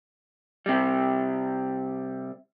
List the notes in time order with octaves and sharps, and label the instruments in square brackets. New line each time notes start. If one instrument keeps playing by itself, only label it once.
[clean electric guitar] C3 G3